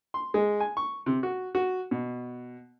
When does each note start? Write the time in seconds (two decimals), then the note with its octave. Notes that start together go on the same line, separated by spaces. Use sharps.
0.14 C6
0.34 G#3
0.60 G#5
0.77 C#6
1.06 C3
1.23 F#4
1.55 F#4
1.91 B2